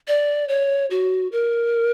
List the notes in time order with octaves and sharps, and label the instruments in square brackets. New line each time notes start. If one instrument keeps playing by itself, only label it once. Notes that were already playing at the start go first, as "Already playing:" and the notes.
[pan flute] D5
C#5
F#4
A#4